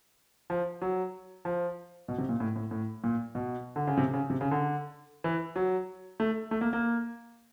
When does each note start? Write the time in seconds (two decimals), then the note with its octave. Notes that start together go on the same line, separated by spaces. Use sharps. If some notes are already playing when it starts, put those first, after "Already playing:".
0.50 F3
0.82 F#3
1.45 F3
2.08 B2
2.18 C3
2.29 A#2
2.40 A2
2.56 A2
2.71 A2
3.04 A#2
3.35 B2
3.76 D3
3.87 C#3
3.97 C3
4.13 C#3
4.30 C3
4.41 C#3
4.51 D3
5.24 E3
5.56 F#3
6.20 A3
6.51 A3
6.61 A#3
6.73 A#3